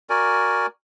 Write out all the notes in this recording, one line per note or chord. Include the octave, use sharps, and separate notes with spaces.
F#4 A#4 D5 G#5